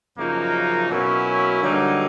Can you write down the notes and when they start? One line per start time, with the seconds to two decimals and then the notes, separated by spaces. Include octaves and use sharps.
0.16 F#2 C#3 F3 A#3 D#4
0.89 B2 F#3 A#3 C#4 E4
1.62 G2 D3 F#3 A#3 D#4